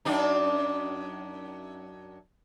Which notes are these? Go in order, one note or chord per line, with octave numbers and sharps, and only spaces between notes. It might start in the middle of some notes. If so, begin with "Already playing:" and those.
F#2 D4 D#4